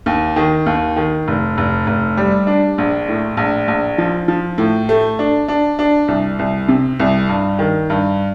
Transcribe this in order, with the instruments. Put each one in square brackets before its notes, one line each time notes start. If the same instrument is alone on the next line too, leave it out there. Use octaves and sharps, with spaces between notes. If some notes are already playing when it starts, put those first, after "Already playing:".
[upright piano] D#2
D#3
D#2
D#3
F1
F1
F1
G3
D4
A#1
A2
A#1
A#1
F3
F3
A2
A3
D4
D4
D4
C2
C2
C3
C2
G2
D#3
G2